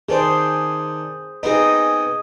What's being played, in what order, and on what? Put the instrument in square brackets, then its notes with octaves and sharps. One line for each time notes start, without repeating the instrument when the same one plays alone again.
[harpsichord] D#3 D4 [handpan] G#4 C5
[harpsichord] B3 C4 D#4 [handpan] G#4 D#5